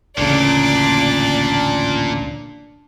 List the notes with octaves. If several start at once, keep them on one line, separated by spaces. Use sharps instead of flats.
A1 D2 A#2 C#3 D4 D5